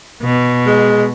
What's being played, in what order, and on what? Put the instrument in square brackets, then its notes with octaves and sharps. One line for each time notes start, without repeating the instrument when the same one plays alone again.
[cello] B2
[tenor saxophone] G#3